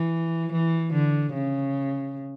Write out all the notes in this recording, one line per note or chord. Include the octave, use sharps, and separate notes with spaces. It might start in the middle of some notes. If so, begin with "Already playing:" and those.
Already playing: E3
E3
D3
C#3